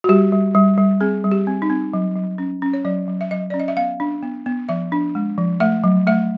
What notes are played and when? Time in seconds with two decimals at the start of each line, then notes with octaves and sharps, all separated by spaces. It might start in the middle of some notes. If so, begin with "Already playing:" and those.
0.04 F#4
0.09 G3 G4
0.32 G3
0.55 G3
0.78 G3
1.01 C4 G#4
1.24 G3
1.32 G4
1.47 C4
1.62 D#4
1.70 C4
1.93 F#3
2.16 F#3
2.38 C#4
2.62 C#4
2.73 C#5
2.85 F#3 D5
3.08 F#3
3.21 E5
3.31 F#3 D#5
3.50 C#4 D5
3.59 D#5
3.68 E5
3.77 B3 F5
4.00 D4
4.23 B3
4.46 B3
4.69 F3 E5
4.92 D4
5.15 G#3
5.38 F3
5.60 A3 E5
5.84 F#3
6.07 A3 E5